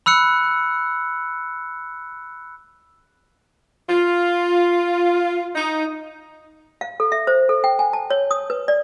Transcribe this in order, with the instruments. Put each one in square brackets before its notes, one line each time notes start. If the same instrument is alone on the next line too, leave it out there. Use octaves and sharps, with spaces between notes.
[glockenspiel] B5 E6 F#6 C#7
[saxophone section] F4
D#4
[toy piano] F5
A4
E5
C5
A4
G5
G#5
A5
C#5
D#6
B4
D5